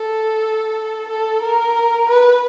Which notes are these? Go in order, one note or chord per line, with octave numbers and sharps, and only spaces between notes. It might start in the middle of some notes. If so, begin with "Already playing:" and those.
Already playing: A4
A4
A#4
B4